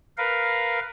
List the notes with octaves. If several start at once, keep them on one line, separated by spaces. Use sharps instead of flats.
A#4 B4 F5